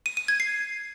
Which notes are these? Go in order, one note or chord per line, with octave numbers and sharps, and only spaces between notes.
D#7
D#7
G#6
C7